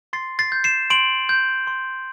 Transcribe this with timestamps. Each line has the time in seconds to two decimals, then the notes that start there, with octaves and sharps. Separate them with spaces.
0.13 C6 A6 C7
0.39 A6 C7
0.52 G6
0.64 C7 E7
0.90 C6 D7 F#7
1.29 G6
1.67 C6